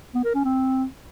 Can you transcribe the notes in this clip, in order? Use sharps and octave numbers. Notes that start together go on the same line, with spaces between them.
B3
A#4
C#4
C4